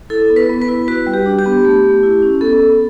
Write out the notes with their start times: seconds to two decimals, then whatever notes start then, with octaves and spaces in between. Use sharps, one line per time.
0.10 E4 A4
0.30 B3
0.36 B4
0.49 B3
0.62 B4
0.68 E4
0.88 F#4 B4
1.07 G3
1.14 G4
1.26 D4
1.39 G4
1.46 B3
1.65 A3
1.84 A3
2.03 E4
2.22 C#4
2.41 B3 A4
2.60 B3